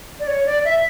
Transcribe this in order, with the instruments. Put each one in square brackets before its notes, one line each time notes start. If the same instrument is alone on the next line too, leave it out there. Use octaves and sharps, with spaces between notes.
[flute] D5
C#5
D5
E5